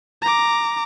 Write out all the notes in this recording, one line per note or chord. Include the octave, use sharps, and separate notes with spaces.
A#5 D6